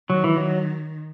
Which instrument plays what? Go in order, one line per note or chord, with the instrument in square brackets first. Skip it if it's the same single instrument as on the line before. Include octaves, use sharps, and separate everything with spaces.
[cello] D#3 [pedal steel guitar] F#3
[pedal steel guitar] E3
F#3